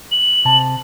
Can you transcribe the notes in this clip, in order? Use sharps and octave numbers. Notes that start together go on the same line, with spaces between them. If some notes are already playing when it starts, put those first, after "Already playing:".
F#7
C3 A5